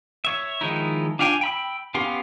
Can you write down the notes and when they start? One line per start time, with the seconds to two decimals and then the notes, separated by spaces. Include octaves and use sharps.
0.25 C#5 E5
0.61 D#3 F3 G#3 D#4 E4
1.19 D4 F4 F5 G5 G#5
1.41 G5 B5 E6
1.94 B3 C#4 G4 F5 C6